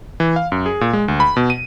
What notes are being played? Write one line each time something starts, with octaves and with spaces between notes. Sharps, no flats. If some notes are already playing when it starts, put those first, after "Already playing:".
E3
F5
F#2
G#4
A#2
G#3
D2
B5
B2
D#7